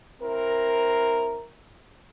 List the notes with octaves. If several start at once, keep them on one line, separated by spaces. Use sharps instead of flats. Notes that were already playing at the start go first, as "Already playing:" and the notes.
C4 E4 A#4